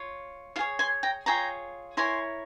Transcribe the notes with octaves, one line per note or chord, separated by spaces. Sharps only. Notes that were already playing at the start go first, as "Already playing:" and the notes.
Already playing: F4 C#5
F4 F5
G#4 C#5
G#5 C6
G5 A#5
F4 G#4 C#5 G5 A#5
E4 A#4 C#5 G#5 C6